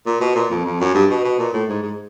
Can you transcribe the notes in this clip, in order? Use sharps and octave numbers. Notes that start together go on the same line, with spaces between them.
A#2
B2
A#2
F2
F2
F#2
G2
B2
B2
A#2
A2
G#2
G#2